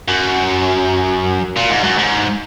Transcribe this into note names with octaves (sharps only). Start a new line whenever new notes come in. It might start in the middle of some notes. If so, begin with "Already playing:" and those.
F#2
A#2
G#2
F#2
G#2